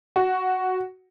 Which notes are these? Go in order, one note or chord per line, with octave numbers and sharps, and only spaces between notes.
F#4